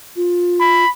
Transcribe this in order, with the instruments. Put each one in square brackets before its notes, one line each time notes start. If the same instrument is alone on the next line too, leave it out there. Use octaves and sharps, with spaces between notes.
[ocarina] F4
[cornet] B5